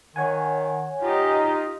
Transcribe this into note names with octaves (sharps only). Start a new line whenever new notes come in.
D#3 C#5 F#5 G#5
D#4 F4 G4 D#5